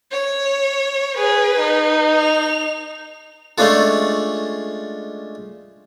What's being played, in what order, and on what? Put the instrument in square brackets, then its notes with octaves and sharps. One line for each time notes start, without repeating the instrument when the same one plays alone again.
[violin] C#5
[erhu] G#4 [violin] B4
[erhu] D#4
[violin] F7
[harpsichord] G#3 A3 C#4 D4 F4 A4